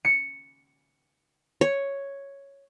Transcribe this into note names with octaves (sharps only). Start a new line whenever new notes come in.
C#7
C#5